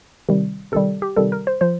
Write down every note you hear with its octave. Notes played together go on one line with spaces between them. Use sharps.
C3 D#3 G3
C3 D#3 G3 A4
G4
C3 D#3 G3 A4
A#4
C5
F3 C5